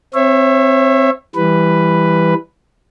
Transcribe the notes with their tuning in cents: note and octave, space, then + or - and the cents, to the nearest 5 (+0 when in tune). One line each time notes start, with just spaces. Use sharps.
C4 +0 C#5 -25 E5 +15
E3 +0 G3 +10 B4 +5